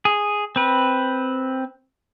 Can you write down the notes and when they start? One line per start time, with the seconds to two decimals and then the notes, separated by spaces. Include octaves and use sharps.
0.05 G#4
0.56 C4 B4